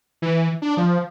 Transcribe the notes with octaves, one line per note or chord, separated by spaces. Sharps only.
E3
D4
F3